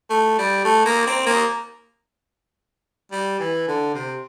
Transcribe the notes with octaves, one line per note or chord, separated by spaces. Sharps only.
A3
G3
A3
A#3
C4
A#3
G3
E3
D3
C3